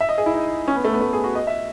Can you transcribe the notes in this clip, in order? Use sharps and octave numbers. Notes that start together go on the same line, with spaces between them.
E5
D#5
G#4
E4
D#4
C#4
B3
A3
B3
A3
G#4
F#4
D#5
E5